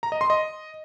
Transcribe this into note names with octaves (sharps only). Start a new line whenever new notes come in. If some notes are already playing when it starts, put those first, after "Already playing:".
A#5
D#5
C6
D#5